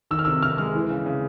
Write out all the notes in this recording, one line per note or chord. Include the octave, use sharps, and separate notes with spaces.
D#3 E6
F6
C3 E6
C3 F6
G#3 F6
E3
C#3
C#3